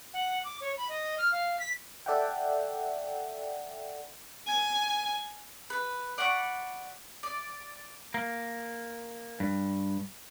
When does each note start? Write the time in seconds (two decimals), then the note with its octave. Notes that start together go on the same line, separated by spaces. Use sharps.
0.14 F#5
0.44 D6
0.61 C#5
0.77 B5
0.89 D#5
1.18 F6
1.32 F5
1.60 B6
2.06 A4 D5 E5 F#5 G5
4.47 G#5
5.70 B4
6.18 D5 F#5 B5 C#6
7.23 D5
8.14 A#3
9.40 G2